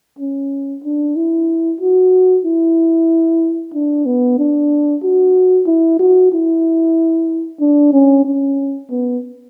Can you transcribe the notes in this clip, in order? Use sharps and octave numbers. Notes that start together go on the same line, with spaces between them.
C#4
D4
E4
F#4
E4
D4
B3
D4
F#4
E4
F#4
E4
D4
C#4
C#4
B3